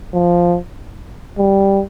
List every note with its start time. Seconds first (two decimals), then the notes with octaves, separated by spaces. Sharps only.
0.14 F3
1.38 G3